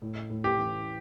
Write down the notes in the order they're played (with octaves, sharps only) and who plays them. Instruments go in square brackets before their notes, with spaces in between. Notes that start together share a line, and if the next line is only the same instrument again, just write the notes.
[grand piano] A2
A2
[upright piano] G4
[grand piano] E3